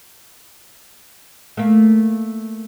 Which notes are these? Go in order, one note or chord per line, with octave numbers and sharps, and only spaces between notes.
A3 A#3